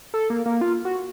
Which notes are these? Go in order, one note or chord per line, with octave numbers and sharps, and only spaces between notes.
A4
A#3
A#3
F4
F#4